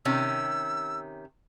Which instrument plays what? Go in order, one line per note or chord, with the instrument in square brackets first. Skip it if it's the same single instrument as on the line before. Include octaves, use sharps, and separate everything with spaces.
[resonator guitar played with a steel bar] C3 D#3 C#4 [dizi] E6